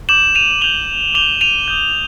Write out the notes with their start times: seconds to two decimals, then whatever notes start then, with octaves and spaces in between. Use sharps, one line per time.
0.09 D6 G6 E7 F#7
0.35 D#7 F7
0.61 D6 G6 F7 G7
1.14 D6 G6 F7 G7
1.41 D#7 F7
1.68 D#6 G6